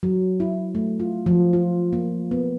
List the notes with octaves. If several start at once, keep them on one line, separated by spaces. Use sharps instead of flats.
F#3
E4
A3
F4
F3
F4
A#3
B3